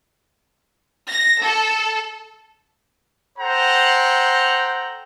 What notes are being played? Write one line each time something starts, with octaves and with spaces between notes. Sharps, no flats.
A#6
A4
A4 C5 F#5 G5 A#5